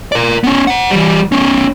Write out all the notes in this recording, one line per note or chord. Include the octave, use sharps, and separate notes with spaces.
A#4 D5
B3 C#4
C5 F#5
E3 G3
B3 C#4